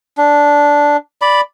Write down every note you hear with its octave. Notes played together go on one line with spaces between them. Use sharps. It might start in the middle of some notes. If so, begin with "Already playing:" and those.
D4
D5 B5